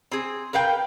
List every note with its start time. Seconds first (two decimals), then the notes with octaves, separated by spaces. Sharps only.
0.11 C4 G#4
0.53 A#4 B4 F5 G5